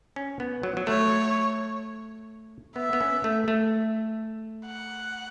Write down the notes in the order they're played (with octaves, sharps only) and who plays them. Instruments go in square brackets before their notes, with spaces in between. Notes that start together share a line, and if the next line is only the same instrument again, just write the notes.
[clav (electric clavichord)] C#4
B3
F#3
F#3
[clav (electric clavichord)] A3 [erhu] C#5
[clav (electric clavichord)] B3 [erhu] E5
[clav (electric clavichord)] B3
C#4
A3
A3
[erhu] F#5